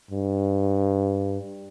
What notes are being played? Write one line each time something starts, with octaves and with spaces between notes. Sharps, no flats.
G2